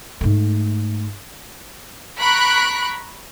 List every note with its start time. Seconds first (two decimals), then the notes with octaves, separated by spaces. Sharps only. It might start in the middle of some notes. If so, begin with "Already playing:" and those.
0.21 G#2 A3
2.18 A#5 B5 C#6 F#6 D7